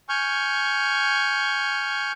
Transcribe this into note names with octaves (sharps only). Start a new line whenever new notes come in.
G#5 C#6 F6 G6